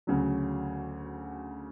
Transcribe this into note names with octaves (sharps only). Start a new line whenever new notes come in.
D2 C#3 F#3